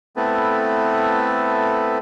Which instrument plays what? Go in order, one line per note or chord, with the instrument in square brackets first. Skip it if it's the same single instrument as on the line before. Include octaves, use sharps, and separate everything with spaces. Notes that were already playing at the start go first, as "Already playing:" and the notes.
[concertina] A3 B3 C4 E4 A4 B4